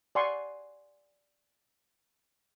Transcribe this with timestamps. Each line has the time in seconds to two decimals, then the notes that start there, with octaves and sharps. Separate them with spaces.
0.15 D5 F#5 G#5 C6 C#6